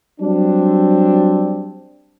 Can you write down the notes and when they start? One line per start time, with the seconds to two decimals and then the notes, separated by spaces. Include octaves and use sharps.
0.20 F#3 G3 C4 D4